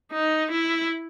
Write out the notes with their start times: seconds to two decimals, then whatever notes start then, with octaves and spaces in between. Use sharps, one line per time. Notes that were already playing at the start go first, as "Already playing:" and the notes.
0.12 D#4
0.51 E4